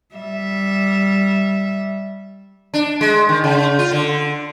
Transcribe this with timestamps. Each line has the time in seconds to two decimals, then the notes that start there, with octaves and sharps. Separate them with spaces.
0.15 G3 E5
2.74 D4
3.01 G#3
3.29 D#3
3.44 C#3
3.79 F4
3.92 D3